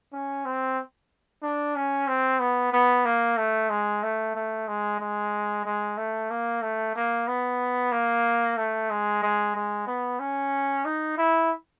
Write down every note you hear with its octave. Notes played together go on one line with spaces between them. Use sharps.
C#4
C4
D4
C#4
C4
B3
B3
A#3
A3
G#3
A3
A3
G#3
G#3
G#3
A3
A#3
A3
A#3
B3
A#3
A3
G#3
G#3
G#3
B3
C#4
D#4
E4